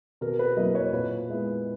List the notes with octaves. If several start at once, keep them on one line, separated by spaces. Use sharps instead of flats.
B2 A#4
B4
F#3 A#3 E4 D#5
C#5
A#2 B4
G#3 B3 E4